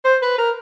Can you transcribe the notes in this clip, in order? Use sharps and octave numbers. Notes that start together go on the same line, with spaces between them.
C5
B4
A#4